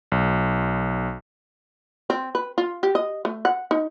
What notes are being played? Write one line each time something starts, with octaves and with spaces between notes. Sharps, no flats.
B1
C4
B4
F4
G4
D#5
A3
F#5
D#4